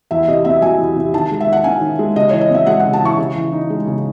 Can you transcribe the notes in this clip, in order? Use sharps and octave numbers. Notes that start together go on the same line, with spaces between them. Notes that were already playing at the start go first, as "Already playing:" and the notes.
E2 E5
C3 D#5
C4 E5
F#3 G#5
E2
C3
D#3 A5
G#3
E5
D#3
F#5
C#4 G#5
D#3
G#3
C#3 D#5
E3 C#5
D#5
C4 E5
G#3 F#5
F#5
C#3
A5
E3 C#6
C#3
E3
D#4
G#3
C#3